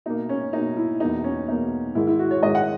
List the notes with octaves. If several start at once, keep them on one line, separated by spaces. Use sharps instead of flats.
B2 A#3 D#4
C#4
B2 A#3 D#4
E4
E2 B2 A#3 D#4
C#4
E2 B2 A#3 D#4
G#2 D#3 G#3 E4
E4
F#4
C#5
G#2 D#3 G#3 D#5
F#5